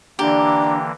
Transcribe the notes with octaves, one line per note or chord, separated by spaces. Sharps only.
D3 E3 A#3 D4 G4 A#5